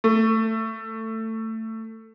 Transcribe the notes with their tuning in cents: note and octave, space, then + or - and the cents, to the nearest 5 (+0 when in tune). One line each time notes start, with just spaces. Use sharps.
A3 +20